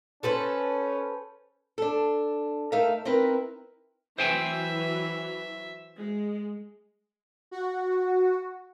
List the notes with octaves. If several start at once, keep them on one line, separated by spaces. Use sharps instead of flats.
C#4 A4 B4 C5
D4 A4
A3 D#4 A#4 E5 F5
C4 D#4 E4 A#4 B4
E3 F#3 C5 E5 G5 G#5
G#3
F#4